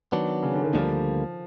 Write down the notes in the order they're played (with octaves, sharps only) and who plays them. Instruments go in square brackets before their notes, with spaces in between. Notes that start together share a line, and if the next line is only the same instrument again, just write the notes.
[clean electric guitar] D#3 F#3 B3 D4
[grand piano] C#3
D3
D#3
[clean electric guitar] D2 D3 G3 A#3 [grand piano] F3